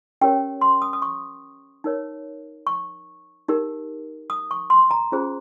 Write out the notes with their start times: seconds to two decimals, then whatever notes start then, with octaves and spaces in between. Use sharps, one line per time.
0.21 C#4 G4 A#4 C#5 G5
0.61 C6
0.82 D#6
0.93 D#6
1.02 C#6
1.84 D#4 A#4 C#5
2.67 C#6
3.48 D#4 G4 A#4
4.30 D#6
4.51 C#6
4.70 C6
4.91 A#5
5.12 C#4 F4 G#4 C5